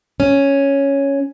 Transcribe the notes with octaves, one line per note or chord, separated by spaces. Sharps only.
C#4